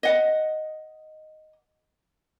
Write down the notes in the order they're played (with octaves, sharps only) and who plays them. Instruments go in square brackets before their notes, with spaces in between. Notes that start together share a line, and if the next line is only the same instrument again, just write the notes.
[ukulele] D#5 F#5